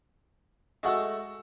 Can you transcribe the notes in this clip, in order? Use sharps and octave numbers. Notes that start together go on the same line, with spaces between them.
G#3 A3 F#4 F#5 E6